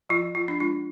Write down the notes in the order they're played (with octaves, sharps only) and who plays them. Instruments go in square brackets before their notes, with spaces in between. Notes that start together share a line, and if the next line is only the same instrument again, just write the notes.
[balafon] F3 F4
F3 F4
D4
G#3 F4